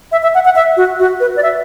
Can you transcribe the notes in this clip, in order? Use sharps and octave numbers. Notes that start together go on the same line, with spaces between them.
E5
E5
F#5
F#5
E5
F#4
F#4
B4
D5
E5